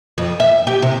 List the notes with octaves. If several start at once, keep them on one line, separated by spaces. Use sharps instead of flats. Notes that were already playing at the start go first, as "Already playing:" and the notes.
F2
E5
G4
C3